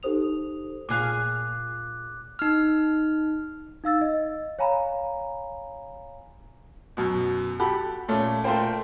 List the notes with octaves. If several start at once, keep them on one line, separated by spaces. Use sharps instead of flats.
D#4 G4 A4 C5 D#6 F7
A#2 G#4 F5 D6 F#6
D#4 F6
D#4 F5 E6 A6
D#5
C#5 F5 G#5 A#5 B5
F#2 B2
F#4 G4 A4 B5
A#2 A3 C#4
A3 A#3 F4 A#4 C5 G5